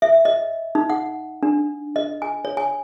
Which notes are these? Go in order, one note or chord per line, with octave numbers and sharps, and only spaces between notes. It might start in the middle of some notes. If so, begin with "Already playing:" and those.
E5
D#5
D#4
F#5
D4
D#5
G#5
C#5
G#5